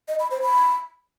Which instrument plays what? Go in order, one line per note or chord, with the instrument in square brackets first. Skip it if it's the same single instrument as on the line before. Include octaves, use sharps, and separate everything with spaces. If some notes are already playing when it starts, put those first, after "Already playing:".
[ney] D#5
B5
C5
B5